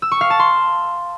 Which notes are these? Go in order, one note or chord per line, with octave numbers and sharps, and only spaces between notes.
E6
C#6
F5
A5
C6